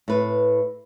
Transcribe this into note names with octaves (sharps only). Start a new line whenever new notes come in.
A2 B4